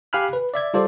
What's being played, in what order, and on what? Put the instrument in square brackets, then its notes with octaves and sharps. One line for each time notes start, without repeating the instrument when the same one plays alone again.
[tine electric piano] G4 F5 G#5 B5 F6 F#6
B4
D5 E5 G#6
G3 F4 A4 C5 D5